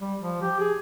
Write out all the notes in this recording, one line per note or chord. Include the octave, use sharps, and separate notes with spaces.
G3
F3
G4
G#4